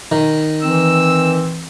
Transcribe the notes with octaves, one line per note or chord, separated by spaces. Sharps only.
D#3
E3 C4 E6